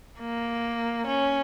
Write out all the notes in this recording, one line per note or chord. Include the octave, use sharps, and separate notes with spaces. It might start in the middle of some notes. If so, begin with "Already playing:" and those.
A#3
C#4